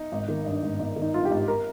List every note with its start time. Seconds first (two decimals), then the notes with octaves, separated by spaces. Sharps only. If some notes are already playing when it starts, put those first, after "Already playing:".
Already playing: D#4
0.12 G#1
0.28 D#3
0.46 G2
0.63 G#1
0.79 G#1 D#4
0.96 D#3
1.02 D#4
1.14 G2 F4
1.25 G4
1.31 G#1
1.48 A#4